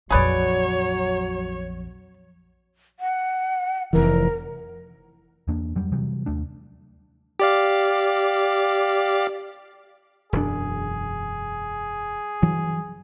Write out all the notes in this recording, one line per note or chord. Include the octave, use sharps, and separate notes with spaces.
A#1 F2 F#3 G#4 B4 C#5 D5
F#5
F1 E3 A#4
E2 A#3 D4
F2 F#3 G3
C3 E3 F#3 G3
D#2 A3 D4
G4 D5 F5
E1 F#2 D4 G#4
G2 E3 F#3